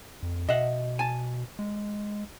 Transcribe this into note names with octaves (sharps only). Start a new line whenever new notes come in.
F2
B2 D#5 E5 F#5
G#5 A5
G#3